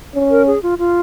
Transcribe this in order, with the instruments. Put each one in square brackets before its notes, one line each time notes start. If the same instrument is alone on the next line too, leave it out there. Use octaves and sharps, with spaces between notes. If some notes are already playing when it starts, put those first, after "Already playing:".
[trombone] C#4
[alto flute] A#4
G#4
F4
F4